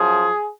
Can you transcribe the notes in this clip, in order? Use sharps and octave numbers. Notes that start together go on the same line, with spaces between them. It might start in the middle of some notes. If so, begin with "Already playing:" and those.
Already playing: F#2 F3 G#4